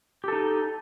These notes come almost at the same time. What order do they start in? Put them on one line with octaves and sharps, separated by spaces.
G4 A4 D#4